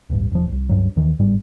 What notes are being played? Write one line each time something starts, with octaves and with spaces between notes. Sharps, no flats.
D1 A1 G2
E1 F3
D1 C2
C#2 G2 F#3
D#2 D#3 E3
G1 G#2 G3